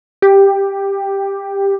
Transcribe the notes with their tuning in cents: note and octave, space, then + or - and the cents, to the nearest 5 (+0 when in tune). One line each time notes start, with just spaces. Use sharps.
G4 +5